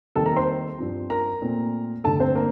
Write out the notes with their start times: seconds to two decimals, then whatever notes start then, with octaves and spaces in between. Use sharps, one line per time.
0.16 D#2 D#3 G3 C4 A4 A5
0.26 A#4 A#5
0.36 C5 C6
0.78 G2 F3 C4
1.10 A#4 A#5
1.41 A#2 A3 C4
2.04 G2 D3 A3 A4 A5
2.20 C4 C5
2.35 A#3 A#4